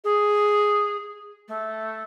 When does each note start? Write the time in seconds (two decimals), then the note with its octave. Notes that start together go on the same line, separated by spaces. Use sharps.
0.04 G#4
1.48 A3